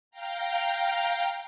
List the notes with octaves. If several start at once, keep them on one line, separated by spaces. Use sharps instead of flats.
F5 G5 A#5